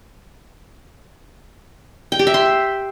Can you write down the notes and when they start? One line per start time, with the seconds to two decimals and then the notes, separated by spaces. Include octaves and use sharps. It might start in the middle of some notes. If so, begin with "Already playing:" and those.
2.12 G5
2.19 G4
2.27 E5
2.34 C6